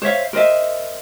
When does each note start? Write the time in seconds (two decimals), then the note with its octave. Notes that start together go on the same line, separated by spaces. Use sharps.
0.02 C5 C#5 E5 F5
0.33 A#4 C5 D#5 E5